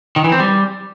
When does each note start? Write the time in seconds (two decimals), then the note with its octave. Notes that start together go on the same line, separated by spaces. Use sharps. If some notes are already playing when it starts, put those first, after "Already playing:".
0.16 D#3
0.24 E3
0.32 C4
0.40 G3